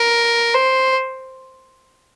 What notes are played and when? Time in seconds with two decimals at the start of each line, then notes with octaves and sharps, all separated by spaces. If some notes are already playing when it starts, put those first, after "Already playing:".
Already playing: A#4
0.54 C5